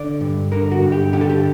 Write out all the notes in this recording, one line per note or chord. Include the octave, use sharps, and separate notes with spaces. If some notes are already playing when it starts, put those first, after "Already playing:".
Already playing: D3 D5
G2
D3 A#4
F#4
G2
G4
D3 G4
A4
G4